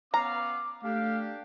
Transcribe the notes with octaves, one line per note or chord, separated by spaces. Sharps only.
B3 C#4 F5 A#5 D6
A3 D4 G4 F5